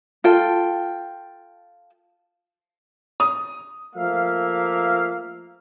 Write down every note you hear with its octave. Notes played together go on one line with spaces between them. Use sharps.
F4 A4 G5
D#6
F3 A3 A#3 E5 F5